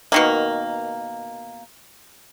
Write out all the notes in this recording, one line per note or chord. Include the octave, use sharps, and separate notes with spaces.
B2 D#3 A#3